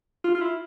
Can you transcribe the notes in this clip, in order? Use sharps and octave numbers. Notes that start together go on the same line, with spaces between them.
F4
F4
E4